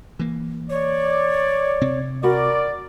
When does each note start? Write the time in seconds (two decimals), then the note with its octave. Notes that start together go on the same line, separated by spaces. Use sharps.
0.19 E3 A#3
0.70 C#5 D5
1.81 C3 C4
2.23 F#4 A#4 D5 F#5 B5